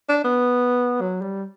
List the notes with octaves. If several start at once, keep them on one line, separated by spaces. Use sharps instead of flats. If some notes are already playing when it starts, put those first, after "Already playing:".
D4
B3
F#3
G3